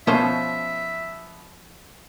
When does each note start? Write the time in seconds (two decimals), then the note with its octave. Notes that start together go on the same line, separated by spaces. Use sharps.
0.07 B2 F3 C#4 C5 E5